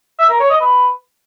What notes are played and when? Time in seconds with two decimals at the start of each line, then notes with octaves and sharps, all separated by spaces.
0.19 E5
0.30 A#4
0.40 C#5
0.50 D#5
0.61 B4